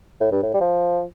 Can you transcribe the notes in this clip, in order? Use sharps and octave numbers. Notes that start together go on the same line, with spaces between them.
A2
G2
A2
G3
F3